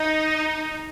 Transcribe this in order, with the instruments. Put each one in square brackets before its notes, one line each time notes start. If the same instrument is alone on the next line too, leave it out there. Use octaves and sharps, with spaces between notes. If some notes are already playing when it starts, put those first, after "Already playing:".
Already playing: [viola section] D#4